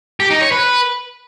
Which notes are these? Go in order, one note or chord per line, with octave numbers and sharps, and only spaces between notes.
G4
D#4
C#5
B4